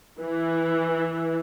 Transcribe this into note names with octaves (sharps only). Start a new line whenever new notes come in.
E3